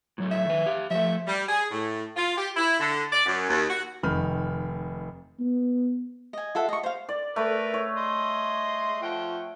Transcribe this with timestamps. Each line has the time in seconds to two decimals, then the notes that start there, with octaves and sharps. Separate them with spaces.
0.18 A2 F#3 A3
0.31 E5
0.47 D#3 B4
0.66 G4 F5
0.90 F3 A3 E5
1.27 G3
1.49 G#4
1.71 A2
2.17 F4
2.37 G4
2.56 E4
2.79 D3
3.12 D5
3.26 F#2
3.49 D#2
3.69 F#4
4.03 F1 D#3 B5 F6
5.40 B3
6.33 D#5 G#5
6.55 F4 A4 E5 F#5
6.69 D#5 C#6
6.83 C5 F5
7.09 D5
7.36 A3 A#4 B4
7.74 C#5
7.97 D#5 C6
9.02 F3 F#5 G5